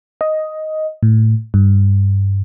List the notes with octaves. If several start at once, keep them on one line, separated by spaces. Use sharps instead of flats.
D#5
A2
G2